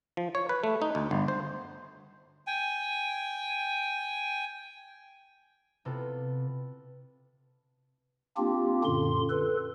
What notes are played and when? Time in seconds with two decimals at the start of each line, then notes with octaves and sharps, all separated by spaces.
0.17 F3
0.35 C#5
0.49 B4
0.64 A3
0.82 D#4
0.95 D2
1.11 G1
1.28 C5
2.47 G5 G#5
5.85 C3 B3 E4 F4 A4
8.37 A#3 C4 D4 F4 G4
8.84 F#2 A#2 D3 C6
9.30 A4 B4